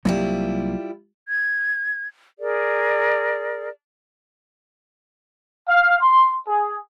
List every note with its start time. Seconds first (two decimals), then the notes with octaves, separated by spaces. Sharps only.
0.05 C2 F#3 G3 A#3 E4 F4
1.28 G#6
2.39 G#4 A#4 D5
5.67 F5
6.01 C6
6.48 G#4